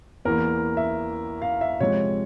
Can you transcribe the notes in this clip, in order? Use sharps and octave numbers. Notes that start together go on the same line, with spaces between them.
E2 E3 A#3 A#4
E5
F5
E5
C3 F3 G#3 C#5